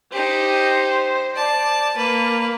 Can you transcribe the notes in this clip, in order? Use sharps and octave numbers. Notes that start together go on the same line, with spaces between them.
D#4 G4 C5
D5 A5
A#3 B4